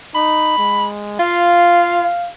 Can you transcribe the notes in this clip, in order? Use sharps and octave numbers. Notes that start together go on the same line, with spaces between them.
D#4 B5
G#3
F4 F5